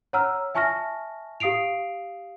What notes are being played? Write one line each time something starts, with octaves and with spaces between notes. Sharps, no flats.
C#5 F#5 A#5 E6 F6
E5 G#5 A5 C#6 F6 A#6
G4 F5 D#6 C7 D7 F7